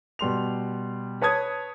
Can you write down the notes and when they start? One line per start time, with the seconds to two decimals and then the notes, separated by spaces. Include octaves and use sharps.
0.19 B2 G3 C6 F7
1.22 B4 C#5 A5 D#6 G#6